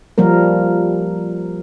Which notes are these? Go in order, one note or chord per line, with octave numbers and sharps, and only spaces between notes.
F3 G3 A#3 A#4